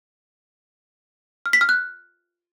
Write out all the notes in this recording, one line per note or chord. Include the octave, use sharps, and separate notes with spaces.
F6
B6
F6
F#6